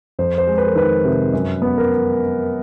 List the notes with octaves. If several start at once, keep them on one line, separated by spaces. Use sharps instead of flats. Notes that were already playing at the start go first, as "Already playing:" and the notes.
F2 C5
C5
G#3
B4
A#4
D#3 B4
C3
F#2
B3
A#4